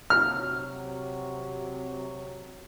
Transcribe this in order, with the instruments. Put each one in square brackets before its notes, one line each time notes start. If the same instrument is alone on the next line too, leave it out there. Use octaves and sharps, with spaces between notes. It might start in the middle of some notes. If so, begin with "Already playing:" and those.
[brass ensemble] C3 F#3 [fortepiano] F6